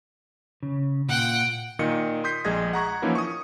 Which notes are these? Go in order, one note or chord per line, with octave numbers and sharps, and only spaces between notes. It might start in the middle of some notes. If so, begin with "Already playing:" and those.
C#3
A#2 F4 F#5 G5
A#2 D#3 D#5 C#7
C6 D#6 G6 B6 C7
A#1 G#3 G#4 D#5 G#6 A#6
F#5 A#5 C#6 G#6
E3 F3 A#3 C#4 D#4 E4
C#6 D#6